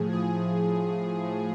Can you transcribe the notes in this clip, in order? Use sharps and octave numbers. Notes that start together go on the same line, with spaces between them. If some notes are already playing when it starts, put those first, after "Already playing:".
Already playing: A2 F3 G#4
G#4
A2 F3